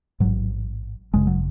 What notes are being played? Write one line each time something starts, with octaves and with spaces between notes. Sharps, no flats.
A1 G#2 F#3
G#1 F#2 C#3 G#3
F#3